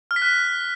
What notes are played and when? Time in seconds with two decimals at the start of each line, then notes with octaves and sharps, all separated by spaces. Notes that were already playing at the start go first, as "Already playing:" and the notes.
0.11 F6
0.16 B6
0.22 F#6